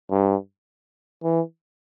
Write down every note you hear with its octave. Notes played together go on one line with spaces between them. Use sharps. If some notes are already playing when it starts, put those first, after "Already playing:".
G2
E3